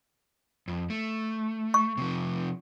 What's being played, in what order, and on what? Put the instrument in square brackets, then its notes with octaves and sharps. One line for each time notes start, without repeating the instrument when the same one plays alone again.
[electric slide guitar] F2
A3
[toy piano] C#6
[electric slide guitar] C3 F3